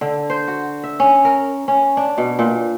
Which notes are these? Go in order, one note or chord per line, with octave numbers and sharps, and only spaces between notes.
D3
C5
F#4
E5
C#4
A#4
C#4
D4
B2
A#2